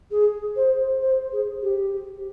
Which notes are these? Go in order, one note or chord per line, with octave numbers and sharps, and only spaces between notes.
G#4
C5
C5
G#4
G4